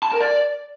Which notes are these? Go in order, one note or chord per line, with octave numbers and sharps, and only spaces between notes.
A5
A#4
D5